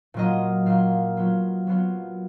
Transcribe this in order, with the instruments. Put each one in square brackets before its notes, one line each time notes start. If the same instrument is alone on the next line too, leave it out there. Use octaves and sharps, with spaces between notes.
[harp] A#2 F#3 A#3 F4 D#5
A#2 F#3 A#3 F4 F5
F#3 B3 F4
F#3 B3 F4